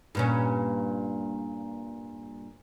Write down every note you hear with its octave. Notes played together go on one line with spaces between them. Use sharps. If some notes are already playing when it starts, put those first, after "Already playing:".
G2 A#2 C#4